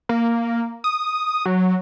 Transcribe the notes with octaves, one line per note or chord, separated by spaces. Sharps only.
A#3
D#6
F#3